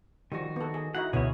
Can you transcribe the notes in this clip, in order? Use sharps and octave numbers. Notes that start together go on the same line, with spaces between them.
D#3 F3 G3 F#4
B3 A4
G#4
D#4 E4 F#4 F#5
D2 B2 B3 C#4 E4 G#4 C#5